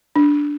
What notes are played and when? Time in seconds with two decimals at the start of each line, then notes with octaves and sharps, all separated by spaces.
0.16 D4